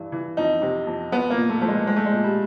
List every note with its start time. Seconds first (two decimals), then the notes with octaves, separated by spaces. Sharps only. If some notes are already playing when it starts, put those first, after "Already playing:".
Already playing: G2 E3
0.12 E3
0.37 F2 D#4
0.62 C3
0.87 F2
1.12 F3 B3
1.30 A#3
1.37 A#2
1.49 A3
1.61 F3 A3
1.68 G#3
1.86 F3 G#3
1.96 A3
2.06 G#3
2.12 A#2
2.24 G3